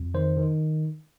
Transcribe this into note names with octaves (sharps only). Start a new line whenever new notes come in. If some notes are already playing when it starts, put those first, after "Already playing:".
Already playing: F2
D#3 C5
D#3